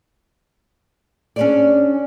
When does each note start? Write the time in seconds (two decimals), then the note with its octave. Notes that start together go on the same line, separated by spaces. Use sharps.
1.36 C#4 D4 F4 G#4 C#5 D5